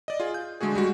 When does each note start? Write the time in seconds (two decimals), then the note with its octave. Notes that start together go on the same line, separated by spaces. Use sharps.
0.08 D5 D#5
0.20 F4 G#4
0.34 G6
0.61 D3 G#3 A3 F#4 G#4
0.75 G3 G#3 F#4